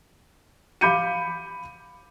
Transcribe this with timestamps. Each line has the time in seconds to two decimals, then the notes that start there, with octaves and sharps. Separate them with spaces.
0.81 F5 B5 D6 G6 C#7 D#7